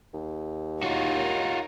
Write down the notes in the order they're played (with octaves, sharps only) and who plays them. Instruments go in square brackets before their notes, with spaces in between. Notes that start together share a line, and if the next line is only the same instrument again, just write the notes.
[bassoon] D#2
[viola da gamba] D#4 A#4 C#5 [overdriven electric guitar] F4 F#4